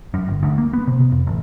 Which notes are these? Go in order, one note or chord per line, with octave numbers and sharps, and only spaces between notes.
F#2
G1
D2
A#3
B3
C3
C3
F2
A1